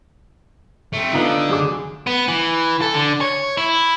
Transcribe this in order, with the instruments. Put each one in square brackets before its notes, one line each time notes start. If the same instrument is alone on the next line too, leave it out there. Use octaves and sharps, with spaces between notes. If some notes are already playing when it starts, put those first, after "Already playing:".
[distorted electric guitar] A3 C4
[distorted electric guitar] D3 [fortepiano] B3 D#4 F4
[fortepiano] F#2 G#4 D6
[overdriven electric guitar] B3
E3
A4
D3
C#5
E4